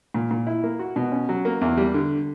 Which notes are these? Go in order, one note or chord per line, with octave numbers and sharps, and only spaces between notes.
A#2
A#2
E4
A#3
F#4
B2
C#4
F#3
A#3
E2
G3
D3